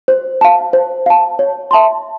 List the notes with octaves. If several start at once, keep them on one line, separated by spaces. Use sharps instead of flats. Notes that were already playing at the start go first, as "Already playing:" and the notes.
C5
F5 A5
C5
F5 A5
C#5
E5 A5 C6